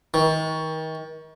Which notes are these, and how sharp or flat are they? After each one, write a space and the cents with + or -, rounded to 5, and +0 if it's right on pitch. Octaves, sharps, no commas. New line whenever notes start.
D#3 +35